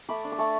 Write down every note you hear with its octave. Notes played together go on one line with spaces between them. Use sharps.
A3 B5 D6
D4
D6
A3 A5 C#6